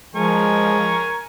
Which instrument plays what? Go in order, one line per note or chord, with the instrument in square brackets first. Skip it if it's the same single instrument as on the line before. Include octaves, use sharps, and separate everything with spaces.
[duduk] F3 [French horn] G#3 [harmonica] A#4 G#5 C#6